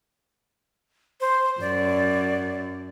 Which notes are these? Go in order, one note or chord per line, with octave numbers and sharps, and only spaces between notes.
C5
F#2 D5